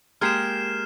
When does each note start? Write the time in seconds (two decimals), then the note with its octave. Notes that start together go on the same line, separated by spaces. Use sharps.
0.21 G#3 A#3 G4 F6 C7 E7